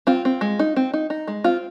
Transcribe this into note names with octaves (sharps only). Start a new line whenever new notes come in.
C4 F4
C4
G#3
D#4
C4
D#4
D#4
G#3
C4 F4